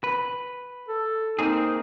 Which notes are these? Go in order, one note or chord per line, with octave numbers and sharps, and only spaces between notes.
B4
A4
A#3 C4 D#4 G#4